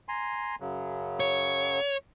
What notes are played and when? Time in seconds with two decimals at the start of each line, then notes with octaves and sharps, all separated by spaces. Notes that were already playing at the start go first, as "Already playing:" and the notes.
0.09 G#5 A#5 C6
0.60 F#2 C#3 F#3
1.20 C#5